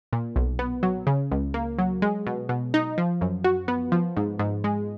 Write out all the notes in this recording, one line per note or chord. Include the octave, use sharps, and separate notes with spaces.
A#2
B1
B3
F#3
C#3
C#2
A#3
F#3
G#3
B2
B2
D#4
F3
F#2
F#4
B3
F3
G#2
G#2
G#3